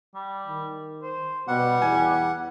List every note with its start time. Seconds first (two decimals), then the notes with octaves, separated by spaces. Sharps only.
0.15 G3
0.46 D#3
1.03 C5
1.48 B2 G3 F#5
1.82 E2 G#5